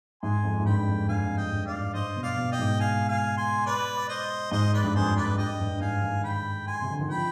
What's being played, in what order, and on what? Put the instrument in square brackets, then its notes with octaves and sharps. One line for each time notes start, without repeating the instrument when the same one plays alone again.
[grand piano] G#2 [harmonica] G#5 C6
[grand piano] F2
G#2
[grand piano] G2 [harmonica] G5 B5
[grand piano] F2
[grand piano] G2 [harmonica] F5 G#5
[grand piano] F2
[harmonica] D#5 G5
[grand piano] G2
[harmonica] D5 F5
[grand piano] G#2
[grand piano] G2 [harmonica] C5 D#5
[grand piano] B2
[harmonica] D5 F5
[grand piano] B2
[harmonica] D#5 G5
[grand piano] G#2
[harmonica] F5 G#5
F5 G#5
G#5 C6
B4 D5
D5
C5 D#5
[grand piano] G#2 [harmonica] C5 D#5
[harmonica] B4 D5
[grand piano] G2
[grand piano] F2 [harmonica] G#4 C5
[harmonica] B4 D5
[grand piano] G2 [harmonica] D#5 G5
[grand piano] G2
[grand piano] G#2 [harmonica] F5 G#5
[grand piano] D#3
[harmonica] G5 B5
G#5 C6
[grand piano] C3
D3
D#3
[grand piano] F3 [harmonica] G5 B5